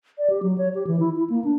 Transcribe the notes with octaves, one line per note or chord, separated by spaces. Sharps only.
D5
G4
F#3
C#5
G4
E3
E4
E4
A#3
D4